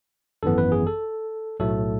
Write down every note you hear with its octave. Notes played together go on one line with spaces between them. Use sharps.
G#1 F#2 E3 B3 A4
B4
G#4
A4
B1 A2 F#3 A3 A4